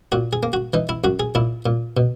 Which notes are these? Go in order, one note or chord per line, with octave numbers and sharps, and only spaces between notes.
A#2 F#4
G#4
A#3
F#4
E3 D#4
E4
F#2 F#4
G#4
A#2 E4
A#2
B2